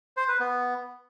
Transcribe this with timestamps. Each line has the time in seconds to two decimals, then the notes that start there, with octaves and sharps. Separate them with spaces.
0.17 C5
0.28 B4
0.40 B3